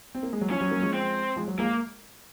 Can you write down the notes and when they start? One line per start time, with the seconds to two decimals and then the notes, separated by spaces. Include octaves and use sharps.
0.15 C4
0.23 A#3
0.33 G#3
0.41 F#3
0.50 F3 C#4
0.61 F#3
0.71 F#3 A#3
0.82 F3 G#3
0.93 C4
1.36 F3 G#3
1.48 F#3
1.58 F3 G#3 A#3